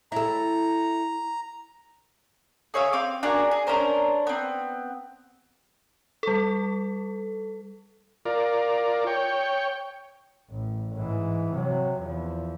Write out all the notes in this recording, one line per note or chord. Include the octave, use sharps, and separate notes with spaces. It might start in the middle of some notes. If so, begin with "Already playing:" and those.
E4 A4 A#5
G#4 C#5 E5 F5
C4 F5 D6
D4 F#4 G#4 A#4
G#4
C#4 D4 A#4 C5
B3 C4
G3 A4
F4 A#4 D5
C#5 G5
A1
G#2 E3
C3 F#3
E2 F3